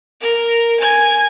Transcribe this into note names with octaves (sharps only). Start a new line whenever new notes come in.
A#4
G#5 G#6